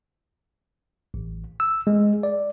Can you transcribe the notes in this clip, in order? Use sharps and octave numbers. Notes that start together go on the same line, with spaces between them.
A1
E6
G#3
D5